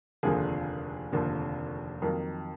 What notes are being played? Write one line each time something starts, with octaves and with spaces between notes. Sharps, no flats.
F1 D#2 D3 F3 A#3 G#4
F1 D#2 D3 F3 A#3
F2 D#3 F#3 A#3 A#4